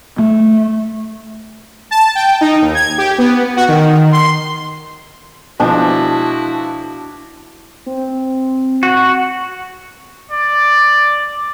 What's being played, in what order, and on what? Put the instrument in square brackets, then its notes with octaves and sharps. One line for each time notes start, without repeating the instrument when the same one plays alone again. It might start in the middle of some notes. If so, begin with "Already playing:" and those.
[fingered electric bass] A3
[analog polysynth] A5
G5
D#4
D#2
G#6
G4
B3
F#4
D#3
C6
[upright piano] B2 F3 G#3 [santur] D4 [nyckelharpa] E4 F#4
[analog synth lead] C4
[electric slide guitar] F#4
[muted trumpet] D5